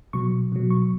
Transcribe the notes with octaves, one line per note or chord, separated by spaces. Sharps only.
B2 F#3 C#6
B2 F#3
C#6